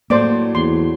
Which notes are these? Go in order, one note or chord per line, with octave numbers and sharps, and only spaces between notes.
A2 F#3 A#3 C5 D5 D6
E2 C6